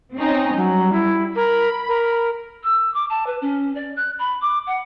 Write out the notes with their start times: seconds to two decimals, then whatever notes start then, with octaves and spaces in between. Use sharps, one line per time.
0.15 C4 C#4 D#4
0.57 F#3 G3
0.93 E4
1.36 A#4 B5
1.89 A#4
2.63 E6
2.94 D6
3.09 A5
3.26 B4
3.41 C#4
3.75 D5
3.96 F#6
4.19 B5
4.41 D6
4.66 F#5